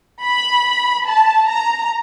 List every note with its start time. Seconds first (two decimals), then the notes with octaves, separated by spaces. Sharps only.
0.23 B5
1.07 A5
1.48 A#5